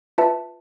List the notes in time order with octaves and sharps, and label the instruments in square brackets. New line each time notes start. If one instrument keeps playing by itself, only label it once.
[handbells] F4 B4 E5 A5